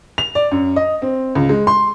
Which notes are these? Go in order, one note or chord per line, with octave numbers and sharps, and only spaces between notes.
F7
D5
F#2
D#5
C4
C#2
G#3
C6